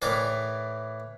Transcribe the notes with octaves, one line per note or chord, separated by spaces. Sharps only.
A2 E3 A#4 D5 D6